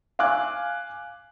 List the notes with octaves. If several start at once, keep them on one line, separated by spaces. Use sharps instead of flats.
F5 G#5 D6 F#6